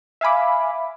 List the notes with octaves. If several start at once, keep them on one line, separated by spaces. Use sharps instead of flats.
E5 F5 G#5 B5 D6